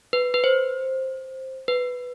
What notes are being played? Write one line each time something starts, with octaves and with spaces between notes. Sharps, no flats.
B4
B4
C5
B4